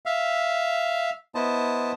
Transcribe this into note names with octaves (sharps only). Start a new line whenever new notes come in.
E5 F5
B3 E4 C5 D#5 A5